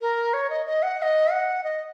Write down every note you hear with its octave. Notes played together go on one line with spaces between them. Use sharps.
A#4
C#5
D#5
D#5
F#5
F#5
D#5
F#5
D#5